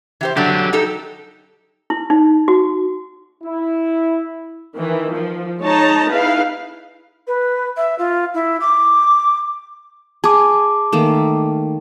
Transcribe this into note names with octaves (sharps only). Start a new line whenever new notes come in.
E3 G4 C5
D3 F#3 D4 G4 F#5
D#4 G4 A4
E4
D#4
F#4
E4
D#3 E3
F3
G#3 D#4 C#5 A5 A#5
D#4 E4 G#4 B4 F5
B4
E5
F4
E4
D6
G#4 A5 D6
D#3 A3 A#3